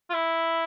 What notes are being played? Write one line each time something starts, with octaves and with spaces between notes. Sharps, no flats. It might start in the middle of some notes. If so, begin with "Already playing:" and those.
F4
E4